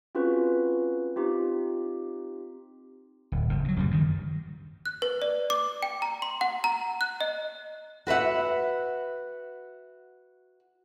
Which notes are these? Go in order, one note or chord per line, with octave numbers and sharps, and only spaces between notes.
C4 C#4 F4 F#4 G#4 B4
C4 D#4 F4 G4
D1
F#1 G2
G2 F#3
F#2 C#3 F#3 G3
G2 D#3
F#6
B4
D5
D6
G5
A#5
C6
F#5
A#5
F#6
D#5
F#4 B4 E5 F#5